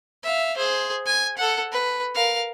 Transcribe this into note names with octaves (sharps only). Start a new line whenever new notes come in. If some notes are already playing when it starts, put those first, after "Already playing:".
E5 F5
G#4 C5
G#5
A4 F#5
B4
A#4 F5